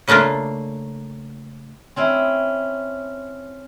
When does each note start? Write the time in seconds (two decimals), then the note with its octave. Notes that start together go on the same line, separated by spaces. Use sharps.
0.08 C#3 A3 A#3 D4 F4
1.96 C4 C#4 E4